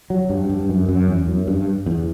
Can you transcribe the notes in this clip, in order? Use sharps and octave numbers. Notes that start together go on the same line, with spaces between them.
F#3
G2
G2
F#2
F#2
E2
F#2
G2
E2